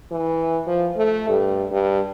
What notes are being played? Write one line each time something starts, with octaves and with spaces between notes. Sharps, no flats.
E3
F3
A3
G2
G2